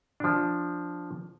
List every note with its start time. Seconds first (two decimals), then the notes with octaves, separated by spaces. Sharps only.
0.20 F3 D4